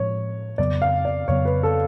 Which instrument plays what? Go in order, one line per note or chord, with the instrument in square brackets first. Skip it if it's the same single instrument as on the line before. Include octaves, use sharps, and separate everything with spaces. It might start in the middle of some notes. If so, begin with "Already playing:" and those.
Already playing: [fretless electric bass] A2 F3 G#3 [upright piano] C#5
[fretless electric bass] F2 C#3 F#3 B3 [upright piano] D5
[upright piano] F5
D5
[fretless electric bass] F2 C#3 F#3 B3 [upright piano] C#5
[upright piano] B4
A4